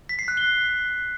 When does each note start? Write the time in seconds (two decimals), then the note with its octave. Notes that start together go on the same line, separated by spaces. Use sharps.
0.09 B6
0.19 C7
0.28 F#6
0.37 G7